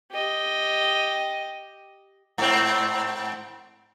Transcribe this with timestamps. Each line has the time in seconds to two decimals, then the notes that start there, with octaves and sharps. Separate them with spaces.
0.12 G4 D#5
2.38 G#2 C4